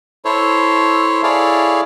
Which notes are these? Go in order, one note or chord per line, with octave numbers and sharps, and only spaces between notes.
E4 A4 C5 C#5
E4 G#4 A4 C#5 D5 F5